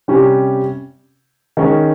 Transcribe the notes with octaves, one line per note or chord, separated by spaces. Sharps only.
C3 G3 C#4 G4
D#3 G#3 C#4